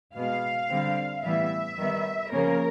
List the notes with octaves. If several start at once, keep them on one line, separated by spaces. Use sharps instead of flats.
B2 G#3 B3 F5
D3 G3 C4
A2 E3 G3 B3 E5
D#3 G3 B3
C#3 F3 A#3 C#4 A#4